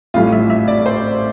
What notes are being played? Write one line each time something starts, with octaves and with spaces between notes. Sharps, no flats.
A1 A2 G3 F4
E5
E5
D5
C5